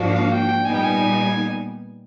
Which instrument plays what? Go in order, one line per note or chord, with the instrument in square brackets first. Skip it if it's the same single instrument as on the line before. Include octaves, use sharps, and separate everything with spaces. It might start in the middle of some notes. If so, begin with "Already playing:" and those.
Already playing: [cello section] G#2 F3 A#3 D4 F#4
[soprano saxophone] F5
G5
G5
[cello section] A#2 G3 B3 D#4 [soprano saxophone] G#5
[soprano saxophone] G5
G#5